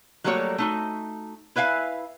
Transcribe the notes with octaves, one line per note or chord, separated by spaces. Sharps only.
F#3 G3 A3 A#3 F#4 C#5
A3 D#4 F#4
E4 B4 E5 F5 G#5